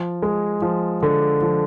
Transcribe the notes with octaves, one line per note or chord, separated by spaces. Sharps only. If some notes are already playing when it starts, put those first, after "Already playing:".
Already playing: F3
G#3
F3
D3
F3